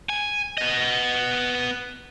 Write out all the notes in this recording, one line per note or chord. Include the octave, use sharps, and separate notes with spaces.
G#5
B3 D#5